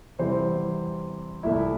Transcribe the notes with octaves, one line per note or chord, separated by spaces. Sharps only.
E2 C3 E3 G3 C4 C5
C2 A#2 A3 E4 E5